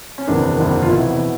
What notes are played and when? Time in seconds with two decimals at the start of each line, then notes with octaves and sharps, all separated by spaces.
0.18 C#4
0.27 F#1 E2 C3 D#3 D4
0.57 F#1 E2 C3 D#3
0.82 F4
0.87 F1 E2 B2 E4
1.17 B2